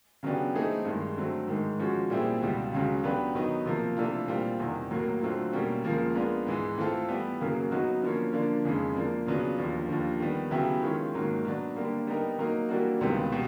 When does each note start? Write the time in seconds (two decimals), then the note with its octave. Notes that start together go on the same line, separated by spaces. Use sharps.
0.23 C#3 F#3 B3 D4 G4
0.54 E3 A3 C4 D#4 G#4
0.85 G2 D#3 G#3
1.17 D3 F#3 A3 C4
1.48 G#2 D#3 G#3
1.79 F3 G#3 C#4 F#4
2.10 A#2 G3 C4 E4 G#4
2.42 C#2 B2 G3
2.73 C#2 C#3 F#3
3.04 F#3 B3 D4 G4 B4
3.35 D#3 F#3 B3 D#4
3.65 C3 F3 A#3
3.97 C3 E3 A3 D4 F4
4.28 A#2 G3 C4 F4
4.59 E2 C3 D#3 G3
4.91 A2 F#3 A#3
5.21 D3 F#3 A3 C4 F4
5.53 B2 G3 A#3 C#4
5.84 C#2 C#3 F3 A#3
6.15 G#3 B3 D4 F4 A#4
6.46 G#2 E3 G#3
6.78 E3 A3 C4 F4 A4
7.09 E3 G3 B3
7.40 F#2 C#3 F#3 A#3
7.71 F#3 B3 D#4 F#4
8.02 D3 F3 A#3 C#4
8.33 D3 F3 A#3 D4
8.65 F2 C#3 E3 G#3
8.95 F3 A#3 D4
9.27 C#3 F#3 B3 D4 F4
9.58 D#2 D3 F3
9.88 D#2 D3 F3
10.20 D#3 G3 B3
10.51 C#3 F#3 B3 E4 G4
10.82 D#3 G#3 C#4 F4
11.14 G#2 D#3 F#3 A#3
11.45 F#3 B3 D4
11.76 D3 G3 A#3
12.07 G3 B3 D#4 G4 A#4
12.39 F#3 A#3 D#4
12.69 E3 G3 A#3 D4 F#4
13.01 C#2 C3 D#3 G3 B3
13.32 B2 G3